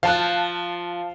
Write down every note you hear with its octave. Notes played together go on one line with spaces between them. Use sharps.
F3 F5 A5 F#6